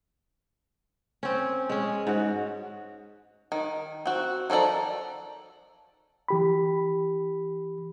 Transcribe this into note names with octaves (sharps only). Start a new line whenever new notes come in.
C4 C#4
G#3 C#4
G#2 F#4
D#3
C4 F#4
D#3 F3 A4 D5 A#5
E3 G4 B5